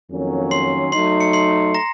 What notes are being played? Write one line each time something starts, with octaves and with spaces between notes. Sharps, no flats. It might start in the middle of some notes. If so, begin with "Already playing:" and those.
F2 D#3 F#3 A#3 C#4
C6 C7
F#3 A3 D#4 C6 C7
C#7
C6 C7
A#5 A#6